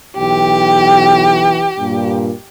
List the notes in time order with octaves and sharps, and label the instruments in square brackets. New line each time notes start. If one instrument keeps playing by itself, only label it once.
[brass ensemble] B1 E3 G5 [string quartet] G4
[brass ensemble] G2 A#2